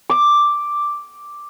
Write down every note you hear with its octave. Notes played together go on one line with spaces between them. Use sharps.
D6